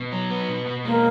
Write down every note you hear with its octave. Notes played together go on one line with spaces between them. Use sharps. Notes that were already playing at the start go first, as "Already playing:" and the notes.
Already playing: B2
F#3
B3
B2
B2
G#3 A#3